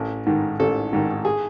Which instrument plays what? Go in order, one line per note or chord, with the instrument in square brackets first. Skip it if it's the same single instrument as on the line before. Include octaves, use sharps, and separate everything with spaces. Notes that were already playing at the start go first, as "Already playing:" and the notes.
Already playing: [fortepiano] A1
G#2 D#3
A1 A4
G#2 D#3
G#4